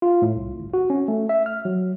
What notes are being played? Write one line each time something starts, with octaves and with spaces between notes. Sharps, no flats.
F4
A2
C2
G1
F#4
C#4
A3
E5
F6
F#3